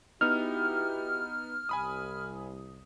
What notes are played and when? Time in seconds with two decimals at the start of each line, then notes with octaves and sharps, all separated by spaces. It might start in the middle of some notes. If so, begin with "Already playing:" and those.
0.21 B3 D#4 E4 F#4 G4 F6
1.69 C2 G#5 B5 D#6